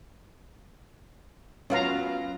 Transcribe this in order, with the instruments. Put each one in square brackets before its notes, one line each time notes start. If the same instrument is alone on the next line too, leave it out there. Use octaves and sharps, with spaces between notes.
[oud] F#3 B3 F4 [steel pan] C#4 F5 A#5